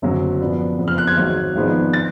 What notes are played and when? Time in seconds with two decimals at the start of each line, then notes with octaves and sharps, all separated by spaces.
0.02 F#1 F#2 D3 F#3
0.40 F#2 F3 B3 D4
0.79 F#1 F2 F3 B3
0.88 F6
0.98 F#6
1.07 G#6
1.17 G#1 G#2 F#3
1.56 G#1 G#2 F3 B3 D4
1.93 A6